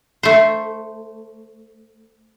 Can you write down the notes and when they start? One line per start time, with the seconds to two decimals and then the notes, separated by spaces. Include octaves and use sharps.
0.23 A3 C5